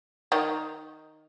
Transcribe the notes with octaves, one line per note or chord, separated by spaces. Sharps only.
D#3 D#4